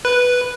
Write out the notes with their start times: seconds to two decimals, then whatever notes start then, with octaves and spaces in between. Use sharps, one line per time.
0.05 B4